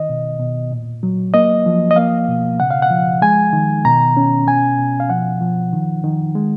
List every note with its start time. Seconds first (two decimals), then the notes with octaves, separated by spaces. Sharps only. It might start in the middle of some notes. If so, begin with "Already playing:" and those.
Already playing: D#3 D#5
0.09 B2
0.40 B2
0.72 A#2
1.03 F#3
1.34 A#3 D#5
1.66 F3
1.91 D#5
1.96 A#3 F5
2.29 B2
2.60 C#3 F#5
2.71 F5
2.82 F#5
2.91 F3
3.22 G#3 G#5
3.53 D#3
3.85 B2 A#5
4.17 C#4
4.47 B2 G#5
4.79 B2
5.00 F5
5.10 F3 F#5
5.41 F3
5.73 D#3
6.04 D#3
6.35 G#3